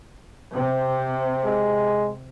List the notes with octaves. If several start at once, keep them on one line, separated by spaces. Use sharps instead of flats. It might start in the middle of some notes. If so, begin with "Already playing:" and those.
C3
G#3